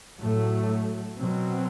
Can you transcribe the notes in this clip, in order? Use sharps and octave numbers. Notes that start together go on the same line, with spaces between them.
A2 F#3 A3
B2 F#3 C4